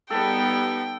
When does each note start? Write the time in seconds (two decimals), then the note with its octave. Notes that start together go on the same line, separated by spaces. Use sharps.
0.10 G3 B3 D#4 A4 G5